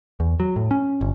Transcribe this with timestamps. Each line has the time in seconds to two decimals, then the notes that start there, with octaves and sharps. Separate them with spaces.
0.20 E2
0.40 F#3
0.56 A2
0.71 C#4
1.01 G1